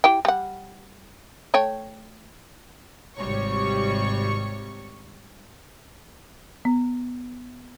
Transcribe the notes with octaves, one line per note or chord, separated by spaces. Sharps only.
E4 G4 G5
G3 F#5
A3 C#5 G5
G#1 C3 G3 C#5 C#6
B3